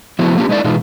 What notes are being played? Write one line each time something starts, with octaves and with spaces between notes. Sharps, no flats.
F3 A3 B3 E4 F#4
A#3 C#4 D4 F4 G4
G#3 A3 D#4 E4 D5
B2 E3 G#3 D#4 F4